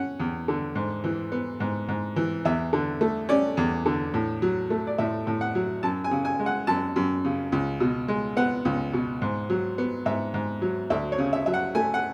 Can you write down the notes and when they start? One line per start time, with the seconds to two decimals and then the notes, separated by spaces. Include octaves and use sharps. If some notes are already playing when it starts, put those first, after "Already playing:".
Already playing: C#4 F#5
0.20 E2
0.48 D3
0.75 G#2
1.04 E3
1.32 B3
1.60 G#2
1.88 G#2
2.16 E3
2.45 E2 E5
2.73 D3
3.01 A3
3.29 C#4 D5
3.57 E2
3.86 D3
4.14 A2
4.42 F#3
4.70 A3
4.87 D5
4.98 A2 E5
5.27 A2
5.41 F#5
5.55 F#3
5.83 F#2 A5
6.04 G#5
6.11 C#3
6.25 G#5
6.39 G#3
6.46 F#5
6.67 F#2 A5
6.96 F#2
7.25 C#3
7.52 C#2
7.80 B2
8.08 G#3
8.37 B3 F#5
8.65 C#2
8.93 B2
9.22 G#2
9.50 F#3
9.78 B3
10.06 G#2 E5
10.34 G#2
10.62 F#3
10.90 D2 E5
11.12 C#5
11.18 C#3
11.33 E5
11.46 F#3 E5
11.54 F#5
11.75 A3 G#5
11.94 F#5